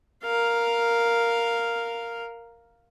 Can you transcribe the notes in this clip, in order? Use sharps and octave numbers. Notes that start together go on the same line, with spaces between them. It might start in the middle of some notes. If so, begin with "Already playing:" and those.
A#4 F5